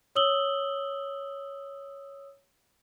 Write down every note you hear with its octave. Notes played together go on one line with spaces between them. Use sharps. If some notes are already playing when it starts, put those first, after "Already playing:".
C#5 D#6 E6 F#7 G7